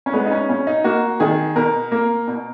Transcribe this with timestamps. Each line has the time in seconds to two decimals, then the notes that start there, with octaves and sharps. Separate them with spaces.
0.06 C#4
0.13 G#3 B3
0.26 D#4
0.31 C#4
0.49 B2 C#4
0.67 D#4
0.84 A#3 F#4
1.20 D#3 G#4
1.56 B2 A#4
1.92 A#3
2.28 B2